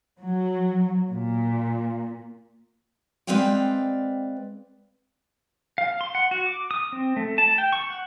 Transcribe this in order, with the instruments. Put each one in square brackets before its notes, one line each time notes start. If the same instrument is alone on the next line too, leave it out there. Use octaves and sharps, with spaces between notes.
[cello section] F#3
A#2
[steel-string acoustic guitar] G#3 C4 B4 D5 F5 G5
[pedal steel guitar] F5
C6
F#5
F#4
D6
D#6
C4
A3
A5
G5
C#6
F#5